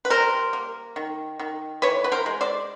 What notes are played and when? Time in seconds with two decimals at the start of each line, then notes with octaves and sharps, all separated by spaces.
0.05 B4
0.10 G3 A#4 C5
0.53 A#3
0.96 D#3
1.39 D#3
1.82 E3 B4 C#5
2.04 B4
2.12 A#4 C5
2.26 G#3
2.41 C5 D5